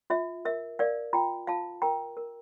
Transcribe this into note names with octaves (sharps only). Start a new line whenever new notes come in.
F4 E5
A#4 E5
A#4 D5 F5
F4 G5 A#5
F4 F5 A5
A#4 G5 A#5
A#4